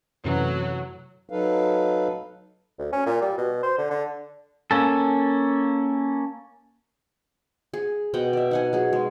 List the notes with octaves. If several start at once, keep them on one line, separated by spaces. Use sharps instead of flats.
F#2 C3 E3 F#3 A3
F#3 D#4 A4 B4 F5
D2
C#4
A#2
G3
B2
C5
D3
D3
A#3 C#4 A4
G#4
B2 D#5 F#5 G5
D5 E5
D#4 F#5 G#5
F#3 G#4
G#3